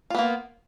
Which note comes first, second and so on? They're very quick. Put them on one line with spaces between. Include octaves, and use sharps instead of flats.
F4 B3 A#3